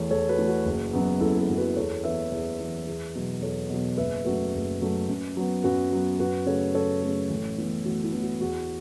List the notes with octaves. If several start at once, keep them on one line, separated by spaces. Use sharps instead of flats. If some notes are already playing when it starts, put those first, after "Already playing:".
Already playing: E2 E3 A3 A4 C#5
E2 A4 C#5
F#4 B4
E3 A3
F#4
F#1
F#2 F#3 B3
F#1 E4 A4
E4 A4
F#2 F#3 B3
F#4 B4
E2 A4 C#5
E3 B3 B4 E5
E2
E3 B3
E2
B2 F#3 B3
E2 A4 C#5
B2 F#3 B3
F#1 B4 E5
F#2 F#3 A3 F#4 B4
F#1
F#2 F#3 A3
F#2
F#3 B3
F#2 F#4 B4
F#3 B3
F#2 F#4 B4
C#3 A3 A4 C#5
F#2 A4 C#5
C#3 A3
A1
A2 E3 B3
A1 F#4
E4
A2 E3 B3
F#4
E2 F#4